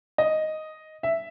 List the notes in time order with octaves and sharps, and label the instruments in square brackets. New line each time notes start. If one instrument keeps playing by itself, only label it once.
[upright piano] D#5
E5